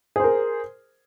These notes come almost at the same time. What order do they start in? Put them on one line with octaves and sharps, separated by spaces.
G#4 C5 A#4